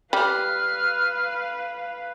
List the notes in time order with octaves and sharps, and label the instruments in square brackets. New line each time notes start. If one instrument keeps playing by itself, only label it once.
[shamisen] G3 [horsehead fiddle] B4 F5 [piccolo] F6